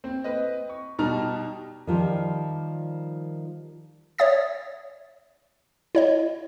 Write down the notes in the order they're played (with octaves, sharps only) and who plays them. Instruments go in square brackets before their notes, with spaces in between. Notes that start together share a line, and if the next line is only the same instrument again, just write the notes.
[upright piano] C4
C4 B4 D#5
C#6
B2 G3 D#4 A5 A#5 F6
[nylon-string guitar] D#3 F3 G3
[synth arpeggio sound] C#5 D5 E5 D#6 A6
E4 C#5 D#5